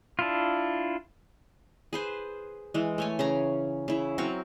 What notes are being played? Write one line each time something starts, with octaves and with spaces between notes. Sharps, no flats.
D4 E4 F4
G#4 B4 C5
E3 G#3
A3 C#5 G#5
C#3 C#4 A#5
C#3 E4
F#3 C4 A#4 C#6